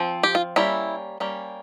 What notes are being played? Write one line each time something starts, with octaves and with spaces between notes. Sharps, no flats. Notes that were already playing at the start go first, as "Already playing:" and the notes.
Already playing: F3 C4
G4
F4
G3 A#3 C#4 E4
G3 A#3 C#4